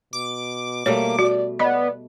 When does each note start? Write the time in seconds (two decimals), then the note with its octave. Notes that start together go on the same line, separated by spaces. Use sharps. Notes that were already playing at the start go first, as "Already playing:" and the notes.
0.13 B2 D6
0.86 B2 G3 A3 A#3 C#5
1.19 F#4 D5
1.59 B3 D5 D#5